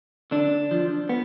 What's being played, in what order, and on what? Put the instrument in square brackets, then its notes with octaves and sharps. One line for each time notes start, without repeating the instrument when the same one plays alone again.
[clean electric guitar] D3 D4
F3
B3